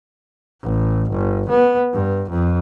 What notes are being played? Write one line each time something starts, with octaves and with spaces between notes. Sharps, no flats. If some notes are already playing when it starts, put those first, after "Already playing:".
A1
G1
B3
G2
F2